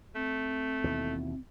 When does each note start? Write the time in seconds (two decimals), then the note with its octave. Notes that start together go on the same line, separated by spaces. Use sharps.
0.15 A3 C4
0.84 D#2 B2 E3